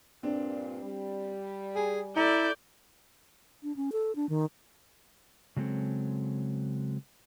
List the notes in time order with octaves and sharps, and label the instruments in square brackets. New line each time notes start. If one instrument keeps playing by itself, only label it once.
[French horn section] G2 A#2 [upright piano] C4 D4
[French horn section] G3
[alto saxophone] G#4 [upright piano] G#5
[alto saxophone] E4 [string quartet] A4 D5 G6 [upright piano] A#5
[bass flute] D4
C#4
A4
D4
D#3
[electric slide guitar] C#3 F#3 G#3 C4 A4